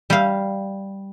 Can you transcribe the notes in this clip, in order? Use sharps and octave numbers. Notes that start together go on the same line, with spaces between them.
G3 F5